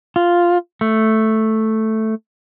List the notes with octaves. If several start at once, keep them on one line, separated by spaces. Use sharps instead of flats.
F4
A3